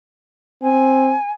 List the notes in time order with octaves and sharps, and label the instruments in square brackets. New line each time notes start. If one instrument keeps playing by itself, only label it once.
[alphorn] C4 [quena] G#5